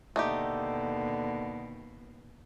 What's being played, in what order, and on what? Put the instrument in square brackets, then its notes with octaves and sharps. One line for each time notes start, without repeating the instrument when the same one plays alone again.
[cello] D#2 B2 [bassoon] D3 [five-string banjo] A3 D#4 G4